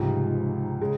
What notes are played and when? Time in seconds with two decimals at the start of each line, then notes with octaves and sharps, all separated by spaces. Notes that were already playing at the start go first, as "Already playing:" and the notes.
Already playing: C#2 G#2 C3 F3
0.81 C#3 G#3